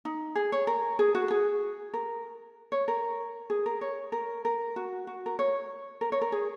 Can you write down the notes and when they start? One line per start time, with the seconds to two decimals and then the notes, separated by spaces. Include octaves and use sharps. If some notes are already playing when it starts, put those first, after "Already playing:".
0.05 D#4
0.35 G#4
0.52 C#5
0.67 A#4
0.99 G#4
1.15 F#4
1.31 G#4
1.94 A#4
2.72 C#5
2.88 A#4
3.50 G#4
3.66 A#4
3.81 C#5
4.12 A#4
4.45 A#4
4.76 F#4
5.07 F#4
5.26 A#4
5.39 C#5
6.01 A#4
6.12 C#5
6.22 A#4
6.32 G#4